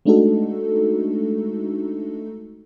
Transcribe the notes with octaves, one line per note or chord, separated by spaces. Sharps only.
G#3 A3 D4 D#4 F#4 A4